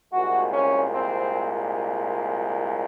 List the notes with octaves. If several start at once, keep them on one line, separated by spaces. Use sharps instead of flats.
C2 A#2 G#3 F#4
C#4
C4